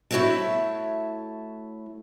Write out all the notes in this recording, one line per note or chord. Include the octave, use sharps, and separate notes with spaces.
A3 E4 F#4 C#5 E5 A5